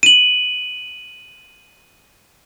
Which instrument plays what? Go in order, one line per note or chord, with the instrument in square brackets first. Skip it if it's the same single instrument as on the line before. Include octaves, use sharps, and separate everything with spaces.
[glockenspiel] D#7 F#7